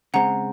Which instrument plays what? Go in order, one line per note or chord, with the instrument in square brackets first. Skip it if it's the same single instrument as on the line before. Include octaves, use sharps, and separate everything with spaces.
[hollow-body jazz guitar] C#3 G#3 C4 [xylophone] F#5 A#5